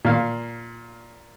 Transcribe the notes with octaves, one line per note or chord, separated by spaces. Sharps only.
A#2 F5